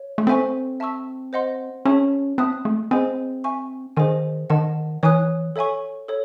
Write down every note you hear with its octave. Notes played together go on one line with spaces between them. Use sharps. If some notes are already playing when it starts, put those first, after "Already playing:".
Already playing: C#5
A3
C4 A4 C5 E5 G#5 C#6
E5 A5 C#6 E6
C5 D#5 F#5 C6
C#4 G#4 C#5 E5 A5 C#6
C4 E5 A5 D#6 F#6
A3
C4 G#4 C5 D#5 G#5
E5 G#5 C#6
D#3 G#4 C5 D#5 G#5
D#3 D#5 F#5 A5
E3 C#5 G#5 D#6 F#6
A4 C#5 E5 G#5 C#6
A4 C#5